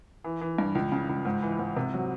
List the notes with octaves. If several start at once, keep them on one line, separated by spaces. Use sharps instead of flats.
E3
E3
G2
C#2
C#3
C#2
G#2
E3
G#2
C3
F#3